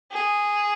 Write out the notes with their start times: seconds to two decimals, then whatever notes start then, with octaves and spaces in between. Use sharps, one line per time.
0.12 G#4